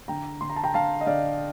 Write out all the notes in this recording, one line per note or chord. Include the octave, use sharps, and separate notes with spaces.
D3 G5 A#5
D3 C6
A#5
A5
G5 A#5
D3 F5 A5
D#5
D3 D5 F5